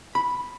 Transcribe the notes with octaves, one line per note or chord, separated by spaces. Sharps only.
B5